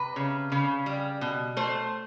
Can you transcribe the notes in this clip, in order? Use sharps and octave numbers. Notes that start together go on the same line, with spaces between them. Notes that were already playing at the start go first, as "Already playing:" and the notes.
Already playing: C3 B4
C#3
C#3
G3
B2
A3 C5